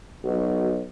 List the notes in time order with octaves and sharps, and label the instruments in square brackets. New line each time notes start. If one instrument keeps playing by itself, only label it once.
[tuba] B1 [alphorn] F#4